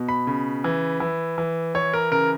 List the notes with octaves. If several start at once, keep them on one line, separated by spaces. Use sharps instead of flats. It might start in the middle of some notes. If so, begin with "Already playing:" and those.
Already playing: B2
B5
C#3
E3
E3
E3
E3 C#5
A#4
C#3 A#4